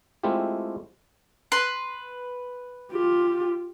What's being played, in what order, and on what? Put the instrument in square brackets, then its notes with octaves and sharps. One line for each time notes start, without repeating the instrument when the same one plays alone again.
[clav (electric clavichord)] G#3 A3 C4 E4 F4 G4
[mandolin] B4 C6
[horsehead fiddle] F4 G4